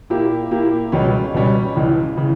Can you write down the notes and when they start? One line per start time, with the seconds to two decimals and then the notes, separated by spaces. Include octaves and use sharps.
0.10 A#2 A#3 E4 G4
0.51 A#2 A#3 E4 G4
0.92 C#2 B2 G3 C#4
1.34 C#2 B2 G3 C#4
1.76 C#2 C#3 E3
2.17 C#3 E3